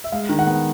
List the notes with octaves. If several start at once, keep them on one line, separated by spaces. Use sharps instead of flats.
E5
G#3 F5
D#3
F#5
B3